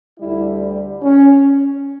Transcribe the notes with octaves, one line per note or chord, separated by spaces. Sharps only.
D2 D3 G3 E4
C#4